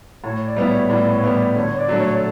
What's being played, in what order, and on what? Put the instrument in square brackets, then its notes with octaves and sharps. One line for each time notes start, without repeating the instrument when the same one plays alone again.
[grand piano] A2 [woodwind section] C#5
[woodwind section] D5
[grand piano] G3 B3 E4
[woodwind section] C#5
[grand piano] A2 [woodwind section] D5
[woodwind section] C#5
[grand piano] G3 B3 E4
[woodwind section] D5
[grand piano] D3 [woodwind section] C#5
[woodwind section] D5
[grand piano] F#3 A3 D4
[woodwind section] C#5
A4